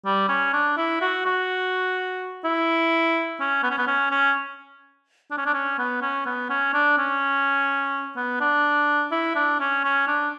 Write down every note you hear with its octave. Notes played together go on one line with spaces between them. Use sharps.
G3
C#4
D4
E4
F#4
F#4
E4
C#4
B3
C#4
B3
C#4
C#4
D4
C#4
D4
C#4
B3
C#4
B3
C#4
D4
C#4
B3
D4
E4
D4
C#4
C#4
D4